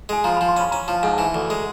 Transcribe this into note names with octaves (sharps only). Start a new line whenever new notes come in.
G#3 G#5
F3 A#5
F3 B5
C6
C#4 B5
C#4 A#5
F3 A5
G#2 G#5
A5
E3 G#5
D2
G#3